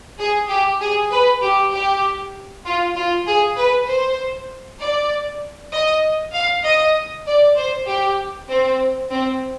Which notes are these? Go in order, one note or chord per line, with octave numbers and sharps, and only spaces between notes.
G#4
G4
G#4
B4
G4
G4
F4
F4
G#4
B4
C5
D5
D#5
F5
D#5
D5
C5
G4
C4
C4